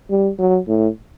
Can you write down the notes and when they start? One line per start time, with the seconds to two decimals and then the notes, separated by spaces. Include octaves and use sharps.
0.10 G3
0.39 F#3
0.68 A2